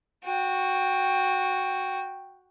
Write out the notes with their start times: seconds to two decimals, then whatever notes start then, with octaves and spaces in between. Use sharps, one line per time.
0.24 F#4 G5